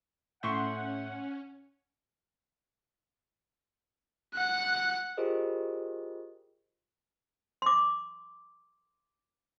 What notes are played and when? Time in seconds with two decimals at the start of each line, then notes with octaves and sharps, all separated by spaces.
0.43 A2 C#4 E5 F#5 C6 C#6 G6
4.34 F#5 F#6
5.17 F4 G4 G#4 A#4 C5 D#5
7.62 C6 D6